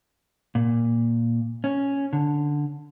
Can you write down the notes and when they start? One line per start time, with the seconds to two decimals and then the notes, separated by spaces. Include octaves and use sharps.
0.55 A#2
1.64 C#4
2.13 D3